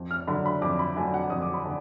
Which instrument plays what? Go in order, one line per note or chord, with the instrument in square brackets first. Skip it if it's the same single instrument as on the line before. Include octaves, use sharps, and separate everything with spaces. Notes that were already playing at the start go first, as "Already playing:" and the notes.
Already playing: [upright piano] F2
F6
D3 F#3 B5
B5
F2 D6
B5
D3 F#3 G#5
F#5
F2 D#6
D6
B5
D3